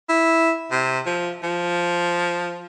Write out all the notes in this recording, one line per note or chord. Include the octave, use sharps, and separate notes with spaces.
E4
C3
F3
F3